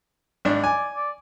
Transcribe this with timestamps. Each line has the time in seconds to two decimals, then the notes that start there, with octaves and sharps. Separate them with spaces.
0.45 G#1 D4
0.64 D5 G#5
0.95 D5